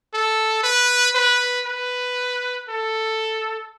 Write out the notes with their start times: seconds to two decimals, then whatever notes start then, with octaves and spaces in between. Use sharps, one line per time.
0.13 A4
0.63 B4
1.15 B4
1.66 B4
2.69 A4